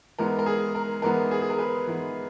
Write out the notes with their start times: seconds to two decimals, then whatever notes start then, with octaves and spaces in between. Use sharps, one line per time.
0.19 G#2 E3 G#3 B3 A#4
0.39 A#4
0.46 G#4
0.75 A#4
1.02 G#2 E3 G#3 B3 A#4
1.31 G#4
1.42 G#4
1.50 A#4
1.58 G#4 B4
1.87 G#2 E3 G#3 B3